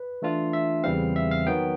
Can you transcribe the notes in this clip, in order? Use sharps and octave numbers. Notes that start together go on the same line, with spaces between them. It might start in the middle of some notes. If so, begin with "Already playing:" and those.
Already playing: B4
E3 A3 D4 F4
E5
E2 C#3 E3 G3 C4 F5
E5
F5
D#3 F#3 B3 G5